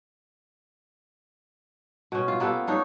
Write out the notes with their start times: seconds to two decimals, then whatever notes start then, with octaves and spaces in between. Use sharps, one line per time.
2.12 B2 C#4
2.28 F4
2.40 A#3 B3 G4 A4
2.67 D4 D#4 C#5